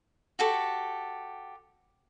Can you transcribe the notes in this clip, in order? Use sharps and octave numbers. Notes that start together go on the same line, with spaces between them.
F#4 G4 A4